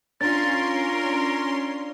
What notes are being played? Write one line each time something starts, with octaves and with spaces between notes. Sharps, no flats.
C#4 D4 F4 A#4 C6 A6